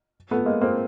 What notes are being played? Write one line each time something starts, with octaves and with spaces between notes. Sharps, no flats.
A3 B3
G#3 A#3
A#3 C4